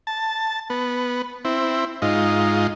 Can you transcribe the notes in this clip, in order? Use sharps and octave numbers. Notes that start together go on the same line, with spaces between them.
A5
B3
C4 E4
G#2 D#4 F4